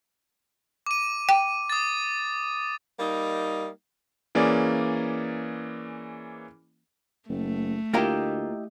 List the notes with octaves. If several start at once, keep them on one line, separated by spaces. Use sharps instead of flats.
D6 D#7
G5
D#6 A6
G3 A#3 D#4
E3 A#3 C#4 G#4 D5
F#1 A3
D2 A#3 E4 F4 G4 A#4 D#5